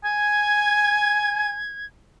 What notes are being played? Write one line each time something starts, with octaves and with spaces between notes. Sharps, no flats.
G#5 G#6